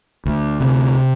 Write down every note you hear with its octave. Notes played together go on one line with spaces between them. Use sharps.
D2
C3